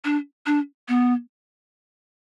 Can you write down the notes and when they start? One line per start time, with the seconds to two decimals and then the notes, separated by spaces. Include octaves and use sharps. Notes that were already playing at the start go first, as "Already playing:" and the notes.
0.05 D4
0.46 D4
0.88 B3